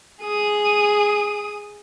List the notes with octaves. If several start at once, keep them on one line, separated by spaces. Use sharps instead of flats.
G#4 D#6